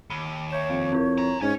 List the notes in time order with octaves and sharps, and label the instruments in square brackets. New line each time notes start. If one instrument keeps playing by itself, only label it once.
[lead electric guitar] D#2 [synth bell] B5 D#7 G7
[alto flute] C#5 [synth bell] E5 G6 E7
[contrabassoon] F2 [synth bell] F5
[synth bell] C4 E4 A#4
[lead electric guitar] G#5 A#5
[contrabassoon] G#2 [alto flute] C#4 [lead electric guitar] C#5 G#5 [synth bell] G#6